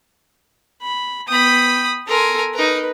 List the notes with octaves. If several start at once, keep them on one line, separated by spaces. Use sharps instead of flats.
B5
B3 G5 B5 D#6
A4 A#4 G#5 C6
D#4 A#4 B4